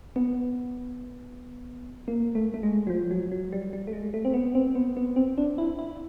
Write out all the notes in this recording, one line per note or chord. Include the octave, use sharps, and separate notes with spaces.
B3
A#3
A3
A3
G#3
F#3
F3
F#3
F#3
G3
G3
A3
G#3
A3
C4
B3
C4
B3
B3
C4
D4
E4
E4